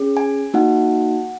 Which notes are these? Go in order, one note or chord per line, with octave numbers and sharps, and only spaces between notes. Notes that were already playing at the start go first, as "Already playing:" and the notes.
Already playing: C#4 G#4
G#5
A#3 D#4 F#4 F#5